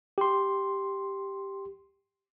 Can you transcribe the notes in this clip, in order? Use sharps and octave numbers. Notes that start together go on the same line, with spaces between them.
G4 C6